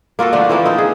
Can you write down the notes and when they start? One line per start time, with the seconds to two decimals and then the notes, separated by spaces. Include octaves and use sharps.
0.19 A#3 F4 F#4 A4
0.33 D3 F3 A3 D4
0.49 E3 F3 A#3 C4
0.65 F3 C4 D#4
0.78 G#4